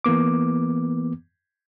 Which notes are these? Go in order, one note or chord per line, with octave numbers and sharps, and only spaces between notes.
E3 A#3 B3 D6